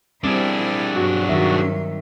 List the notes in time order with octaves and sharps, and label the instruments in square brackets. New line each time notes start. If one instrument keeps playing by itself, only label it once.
[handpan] G3 C4 [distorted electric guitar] D4 G#4 [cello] E4
[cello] G2 F#3 [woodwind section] F#4
[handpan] D#3 A#4 E5